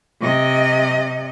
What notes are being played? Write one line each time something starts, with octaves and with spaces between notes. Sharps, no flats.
C3 D#5